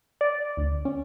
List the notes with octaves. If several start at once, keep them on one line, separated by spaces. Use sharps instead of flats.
D5
D2
C#4